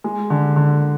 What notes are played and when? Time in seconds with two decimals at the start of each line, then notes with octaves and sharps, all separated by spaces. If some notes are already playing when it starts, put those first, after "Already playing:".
0.04 G#3
0.30 D3
0.56 D3